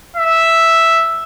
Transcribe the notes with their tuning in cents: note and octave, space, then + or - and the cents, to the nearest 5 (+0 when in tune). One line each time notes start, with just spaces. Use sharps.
E5 +0